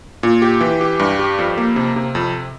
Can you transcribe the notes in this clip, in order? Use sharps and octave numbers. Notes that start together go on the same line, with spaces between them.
A#2
G4
E3
G4
G2
G4
F2
A#3
C3
C3
F2